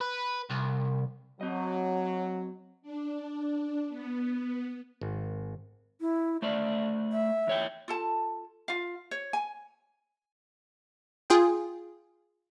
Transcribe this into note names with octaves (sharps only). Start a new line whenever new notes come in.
B4
C2
F#3 C4 D#5
D4
B3
G#1
E4
A3 C5 D5 E5
E5
E2 C#5 G5
F4 A4 A5
F4 F5
C#5
G#5
F4 G#4 G5